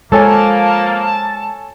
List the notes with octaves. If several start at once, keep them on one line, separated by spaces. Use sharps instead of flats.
F3 G#3 A#3 A4 C#5 G#5 A5